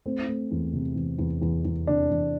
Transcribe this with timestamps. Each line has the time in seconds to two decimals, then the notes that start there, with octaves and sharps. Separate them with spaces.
0.06 A3 C4
0.28 A3
0.51 E2
0.73 C3
0.95 E2
1.18 E2
1.42 E2
1.64 E2
1.87 C3 D4
2.10 E2